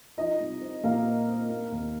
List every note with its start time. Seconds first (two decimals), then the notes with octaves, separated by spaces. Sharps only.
0.17 F3 D#4 D#5
0.40 C2
0.62 C4
0.84 A#2 A#3 A#4
1.06 C4
1.28 C4
1.50 A#3
1.72 D#2